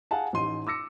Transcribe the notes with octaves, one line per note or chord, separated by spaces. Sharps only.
G#4 F5 F#5 G#5 A5
A1 D#4 C6 D#7
D6 E6 A#6 C#7